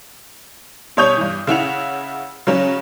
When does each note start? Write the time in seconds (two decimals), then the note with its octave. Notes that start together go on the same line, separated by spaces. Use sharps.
0.97 B2 G3 C#5 D#6 G6 F7
1.17 G2 E3
1.47 C#3 E4 F#5 F7
2.47 C#3 F#3 C#4